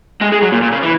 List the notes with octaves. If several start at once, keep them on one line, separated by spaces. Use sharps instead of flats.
G#3
G#3
F#3
A#2
A#2
C#3
E3